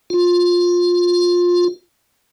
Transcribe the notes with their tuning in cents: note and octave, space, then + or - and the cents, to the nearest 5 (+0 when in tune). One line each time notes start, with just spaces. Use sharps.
F4 +15